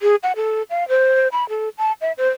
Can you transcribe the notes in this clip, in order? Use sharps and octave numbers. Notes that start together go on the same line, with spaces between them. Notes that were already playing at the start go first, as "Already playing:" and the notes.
G#4
F#5
A4
F5
C5
B5
A4
A5
E5
C5